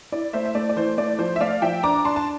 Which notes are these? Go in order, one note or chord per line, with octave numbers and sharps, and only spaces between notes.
E4 D5
A3 C5 E5
E5
A3 D5
D5
E3 C5
A3 D5
F3 C5
E5
A3 D5 F5
F3 E5 G5
D4 A#5 D6
D4 A5 C6
A5